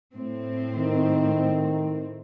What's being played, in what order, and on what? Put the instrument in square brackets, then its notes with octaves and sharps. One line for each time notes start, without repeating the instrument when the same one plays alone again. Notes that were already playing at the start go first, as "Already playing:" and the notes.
[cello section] A2 C4
[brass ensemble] D#3